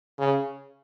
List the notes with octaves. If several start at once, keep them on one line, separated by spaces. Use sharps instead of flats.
C#3